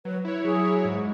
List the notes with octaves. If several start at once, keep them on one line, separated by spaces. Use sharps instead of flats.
F#3 B4
E4 C#5
F#3 G#4
E4 C#5
G#2